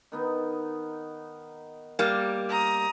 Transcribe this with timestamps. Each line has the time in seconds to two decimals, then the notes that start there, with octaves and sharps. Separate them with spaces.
0.12 D#3 B3 D#4
1.99 G3 A#3
2.48 A#5 D#6